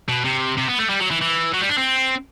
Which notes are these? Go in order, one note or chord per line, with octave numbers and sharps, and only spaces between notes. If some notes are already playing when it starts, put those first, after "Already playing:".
B2
C3
C3
B3
A3
G3
F#3
E3
E3
F#3
G3
D4
C4